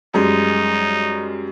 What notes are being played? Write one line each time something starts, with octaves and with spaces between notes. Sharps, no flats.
F#2 G3 G#3 D#4